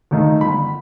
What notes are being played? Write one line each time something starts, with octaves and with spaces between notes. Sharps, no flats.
D#2 D#3 A3 D#4
G1 B5